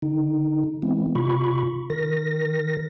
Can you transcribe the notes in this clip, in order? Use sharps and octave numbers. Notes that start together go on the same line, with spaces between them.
D3 D#4
E3 G#3 B3 C4 E4
C3 F4 B5 C#6
D#3 A#4 A#6